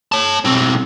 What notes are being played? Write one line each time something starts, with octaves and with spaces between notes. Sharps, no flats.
C#5 A5
B1 C4